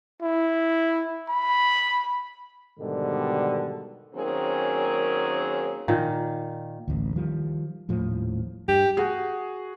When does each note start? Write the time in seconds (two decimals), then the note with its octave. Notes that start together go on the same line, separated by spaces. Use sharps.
0.22 E4
1.29 B5
2.79 G#2 B2 D3 D#3 G3
4.14 D#3 F#3 A#3 C4 C#4 G#4
5.88 A#2 D#3
6.88 A1 D2
7.16 D#3 F3 G3
7.89 D#1 A2 F3
8.68 G2 G4
8.97 F#4 G#4